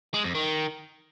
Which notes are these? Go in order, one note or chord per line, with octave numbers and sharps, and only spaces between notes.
G#3
F2
D#3